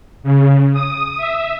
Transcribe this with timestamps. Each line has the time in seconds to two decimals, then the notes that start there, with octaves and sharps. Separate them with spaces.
0.23 C#3
0.73 D#6
1.17 E5